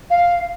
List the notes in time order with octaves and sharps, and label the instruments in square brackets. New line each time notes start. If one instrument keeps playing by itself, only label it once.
[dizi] F5